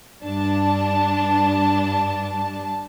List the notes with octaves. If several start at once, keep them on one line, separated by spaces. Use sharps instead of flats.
G2 D4 A5